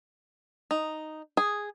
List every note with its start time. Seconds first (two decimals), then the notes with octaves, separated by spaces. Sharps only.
0.71 D#4
1.37 G#4